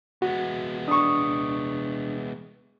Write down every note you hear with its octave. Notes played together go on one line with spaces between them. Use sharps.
G#3 B3 F#4
D4 C#6 D#6